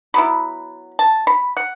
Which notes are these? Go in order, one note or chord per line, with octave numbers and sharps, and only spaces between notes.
F#3 B3 E4 B5
A5
B5
F#5